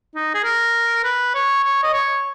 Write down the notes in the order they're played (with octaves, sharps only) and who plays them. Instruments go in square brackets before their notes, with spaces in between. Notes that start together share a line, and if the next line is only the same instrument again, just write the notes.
[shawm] D#4
G#4
A#4
B4
C#5
C#5
D#5
C#5